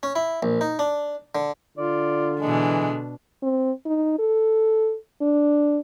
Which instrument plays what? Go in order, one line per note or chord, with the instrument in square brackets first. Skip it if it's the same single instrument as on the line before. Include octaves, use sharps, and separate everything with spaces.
[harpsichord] C#4
E4
A#1
D#4
D4
D3
[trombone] D3 [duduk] F4 [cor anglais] D5
[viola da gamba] B2 D4 [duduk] E3 [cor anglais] G#3
[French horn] C4
D#4
A4
D4